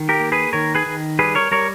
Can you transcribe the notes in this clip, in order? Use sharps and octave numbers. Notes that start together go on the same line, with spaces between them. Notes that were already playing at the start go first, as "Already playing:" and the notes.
Already playing: D#3
G4 A#4
A#3
G#4 B4
D#3 A#4 C#5
G#4 B4
D#3
G3 G#4 B4
A#4 C#5
G3 A#4 C#5